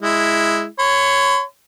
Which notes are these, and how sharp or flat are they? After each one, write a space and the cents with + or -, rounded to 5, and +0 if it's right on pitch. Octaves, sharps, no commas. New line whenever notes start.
G#3 +0 E4 +0
C#5 +0 B5 +45